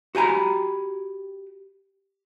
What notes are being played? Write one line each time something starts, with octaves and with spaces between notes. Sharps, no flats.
F#4 G4 G#5 A#5 B5